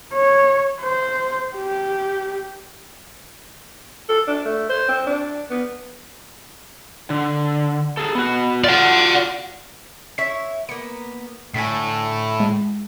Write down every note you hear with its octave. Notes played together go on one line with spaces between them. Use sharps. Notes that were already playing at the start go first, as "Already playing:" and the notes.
C#5
C5
G4
A4
D4
A3
C5
C4
D4
B3
D3
G#4 A4
B3 F#4
F4 F#4 D5 F#5
E4 C#5 E5 B6
A#3 B3 C#7
A2 D3 G#5 B6
G#3